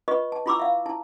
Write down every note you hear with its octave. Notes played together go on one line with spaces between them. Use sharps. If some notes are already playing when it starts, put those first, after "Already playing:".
F4 B4 D#5 C#6
A5
E4 F4 B5 C#6 D6 E6
E5 F5
E4 A5